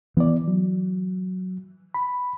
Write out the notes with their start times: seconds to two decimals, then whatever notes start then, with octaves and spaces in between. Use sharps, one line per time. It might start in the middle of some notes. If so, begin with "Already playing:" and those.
0.17 E3 B3 D5
0.48 F#3
1.94 B5